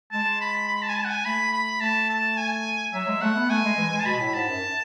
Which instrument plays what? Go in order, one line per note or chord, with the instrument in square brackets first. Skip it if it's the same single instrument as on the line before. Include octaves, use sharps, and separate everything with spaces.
[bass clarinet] G#3 [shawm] A5
[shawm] B5
B5
A5
G#5
A5
F#5
G#5
[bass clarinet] A3 [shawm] B5
[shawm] B5
[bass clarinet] A3 [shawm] A5
[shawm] A5
G#5
[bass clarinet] F#3 [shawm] E5
[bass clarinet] G#3
[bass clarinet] A3 [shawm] F#5
[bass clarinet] B3
[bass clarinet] A3 [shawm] G#5
[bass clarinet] G#3
E3
G#3
[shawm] A5
[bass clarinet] B2 [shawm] B5
[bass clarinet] A2
[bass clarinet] G#2 [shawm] A5
[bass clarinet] F#2